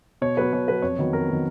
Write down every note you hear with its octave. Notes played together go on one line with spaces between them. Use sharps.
B2 C#5
F#3 B3 B4
B2 C#5
F#3 B3 B4
F2 C#5
D#3 F#3 B3
F2 A#4
D#3 F#3 B3